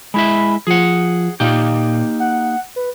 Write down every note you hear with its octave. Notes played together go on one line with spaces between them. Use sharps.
G#3 E4 E5 B5
F3 G#4 F#5
A#2 A#3 D#4 G4
F#5
B4